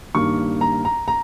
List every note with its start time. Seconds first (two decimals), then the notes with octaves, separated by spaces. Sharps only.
0.15 G2 D#3 A#3 C#6
0.61 A#5
0.85 A#5
1.08 A#5